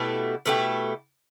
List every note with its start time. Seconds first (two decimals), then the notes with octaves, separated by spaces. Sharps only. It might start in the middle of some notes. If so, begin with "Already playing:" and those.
Already playing: B2 A3 E4 G4
0.46 B2 A3 E4 G4